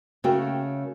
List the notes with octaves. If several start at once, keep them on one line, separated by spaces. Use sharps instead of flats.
C#3 A3 F#4 A#4 G5